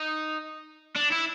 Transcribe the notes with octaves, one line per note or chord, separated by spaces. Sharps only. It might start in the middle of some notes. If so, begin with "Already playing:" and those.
Already playing: D#4
D4
E4